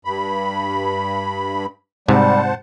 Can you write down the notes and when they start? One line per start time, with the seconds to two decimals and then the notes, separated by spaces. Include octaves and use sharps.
0.05 G2 B5
2.08 G#2 C3 G3 C5 F#5 A5